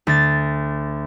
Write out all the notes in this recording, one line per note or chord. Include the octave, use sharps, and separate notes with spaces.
D2 A6